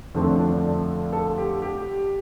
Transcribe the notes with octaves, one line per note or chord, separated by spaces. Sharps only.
F2 D3 F3 A3 C4
D4
D4
D4
A4
G4
G4